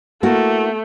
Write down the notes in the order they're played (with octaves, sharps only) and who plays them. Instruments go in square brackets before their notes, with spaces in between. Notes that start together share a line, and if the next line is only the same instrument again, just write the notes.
[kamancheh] A3 [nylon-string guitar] A#3 E4 F#4